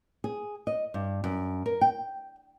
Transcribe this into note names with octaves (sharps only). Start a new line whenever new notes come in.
G#4
D#5
G2
F#2
A#4
G5